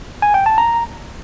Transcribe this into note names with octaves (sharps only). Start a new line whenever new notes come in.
G#5
G5
A5
A#5